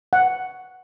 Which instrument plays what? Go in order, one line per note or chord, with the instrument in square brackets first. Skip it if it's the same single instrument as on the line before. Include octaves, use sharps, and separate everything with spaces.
[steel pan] F#5